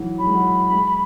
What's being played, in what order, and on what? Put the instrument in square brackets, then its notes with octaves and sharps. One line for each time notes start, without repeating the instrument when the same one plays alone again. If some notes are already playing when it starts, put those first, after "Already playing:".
Already playing: [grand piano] E3 F#3
[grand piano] F#3 [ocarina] B5
[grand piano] G#3
F#3
G#3